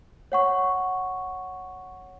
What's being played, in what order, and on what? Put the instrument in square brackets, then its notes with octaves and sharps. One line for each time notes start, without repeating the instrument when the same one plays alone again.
[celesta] C#5 F#5 C#6